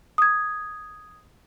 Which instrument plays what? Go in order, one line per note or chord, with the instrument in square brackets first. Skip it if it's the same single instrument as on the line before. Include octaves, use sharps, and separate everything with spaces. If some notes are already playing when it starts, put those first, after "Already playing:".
[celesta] D#6 G#6